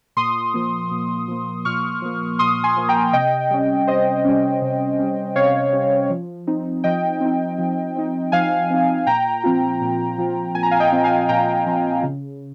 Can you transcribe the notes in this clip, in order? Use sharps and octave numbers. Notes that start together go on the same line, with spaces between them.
A#2 C6 D#6
F3 A#3
A#2
F3 A#3
A#2 C#6 F6
F3 A#3
A#2 C6 D#6
G#5 C6
F3 A#3
G5 A#5
C3 D#5 G5
G3 C#4
C3 C5 D#5
G3 C#4
C3
G3 C#4
C3 C#5 F5
G3 C#4
F3
C4 D#4
F3 D#5 G5
C4 D#4
F3
C4 D#4
F3 F5 G#5
C4 D#4
A#2 G5 A#5
F3 C4 F4
A#2
F3 C4 F4
A#2 G#5
A#5
F5 G#5
D#5 G5
F3 C4 F4
F5 G#5
A#2 G5 A#5
F3 C4 F4
C#3